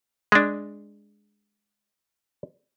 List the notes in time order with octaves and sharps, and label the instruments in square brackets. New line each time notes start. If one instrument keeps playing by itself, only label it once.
[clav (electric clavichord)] G#3 D4